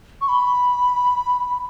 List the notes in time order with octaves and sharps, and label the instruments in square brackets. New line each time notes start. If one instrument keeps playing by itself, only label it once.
[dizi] C#6
B5